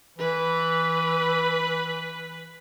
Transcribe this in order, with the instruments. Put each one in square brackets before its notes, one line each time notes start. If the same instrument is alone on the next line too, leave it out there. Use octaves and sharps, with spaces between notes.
[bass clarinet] E3 [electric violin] B4